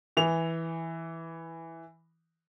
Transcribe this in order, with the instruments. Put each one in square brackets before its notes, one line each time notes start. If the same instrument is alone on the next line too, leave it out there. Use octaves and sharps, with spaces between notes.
[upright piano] E3 F7